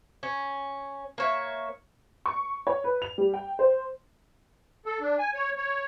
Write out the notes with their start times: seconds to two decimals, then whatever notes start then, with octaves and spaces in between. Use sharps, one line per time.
0.23 C#4
1.18 A#3 C#5 E5
2.26 C#6
2.67 C#5
2.84 B4
3.02 F7
3.18 G3
3.34 G5
3.59 C5
4.86 A4
5.01 D4
5.19 G#5
5.34 C#5
5.57 C#5